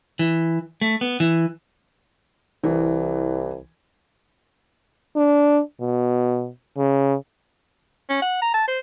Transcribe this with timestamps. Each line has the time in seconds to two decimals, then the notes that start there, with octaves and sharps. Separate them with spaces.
0.19 E3
0.81 A3
1.01 B3
1.20 E3
2.64 C2 E3
5.16 D4
5.81 B2
6.77 C#3
8.10 C#4
8.22 F#5
8.42 A#5
8.54 A5
8.68 C5